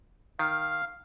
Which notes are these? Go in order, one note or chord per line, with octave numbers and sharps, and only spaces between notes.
D#3 F5